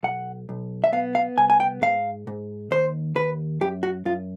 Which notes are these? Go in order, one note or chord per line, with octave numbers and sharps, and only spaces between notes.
B1 F#5
B1
E5
B3 F5
F5
C2 G#5
G#5
G5
G#2 F5
G#2
D#2 C5
D#2 B4
F#2 G4
F#4
F#2 F4